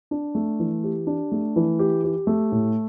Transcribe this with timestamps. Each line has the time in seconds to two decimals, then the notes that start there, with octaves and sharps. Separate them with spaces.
0.11 D4
0.35 A3
0.59 E3
0.84 G4
1.07 D4
1.32 A3
1.56 E3
1.79 G4
2.04 G4
2.27 A3
2.52 A2